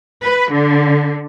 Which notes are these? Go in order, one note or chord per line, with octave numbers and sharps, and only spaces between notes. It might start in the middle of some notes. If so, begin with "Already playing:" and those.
B4
D3